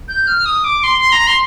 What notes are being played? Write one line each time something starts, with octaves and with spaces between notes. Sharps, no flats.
G6
F6
D#6
D6
C6
C6
A#5
C6